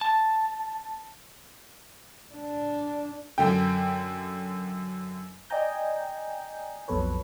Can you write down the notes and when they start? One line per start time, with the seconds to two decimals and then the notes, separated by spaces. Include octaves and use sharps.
0.01 A5
2.34 D4
3.38 F#2 D3 G5
5.50 D5 D#5 G5 G#5 A#5 G6
6.88 B1 F2 B2 A4 B4 C#5